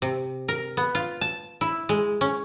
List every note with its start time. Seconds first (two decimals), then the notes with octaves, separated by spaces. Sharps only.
0.02 C3
0.48 A#4
0.77 B3
0.95 F4
1.21 A5
1.61 E4
1.89 G#3
2.21 C#4